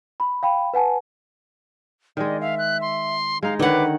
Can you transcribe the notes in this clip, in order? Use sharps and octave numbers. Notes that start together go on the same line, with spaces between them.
B5
F5 G5 B5
B4 F#5 G#5 A5
D#3 G#3 D5 D#5
E5 F5
F#6
C6
G#3 D#4 F5
D3 D#3 B4 C#5 F#5 D6